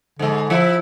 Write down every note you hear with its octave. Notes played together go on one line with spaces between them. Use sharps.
G#2 D3 G#3
F3 E4